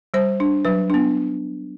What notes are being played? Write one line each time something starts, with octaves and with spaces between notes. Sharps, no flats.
G3 C5
D4
F#3 B4
B3 D4